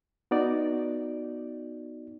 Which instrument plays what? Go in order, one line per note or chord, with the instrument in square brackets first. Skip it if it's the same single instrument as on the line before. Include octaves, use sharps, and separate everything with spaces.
[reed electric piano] B3 D#4 F#4 D5